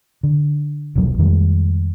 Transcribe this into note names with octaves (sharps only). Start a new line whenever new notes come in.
D3
E1 C2 B2 F#3
F2 D#3 G3 G#3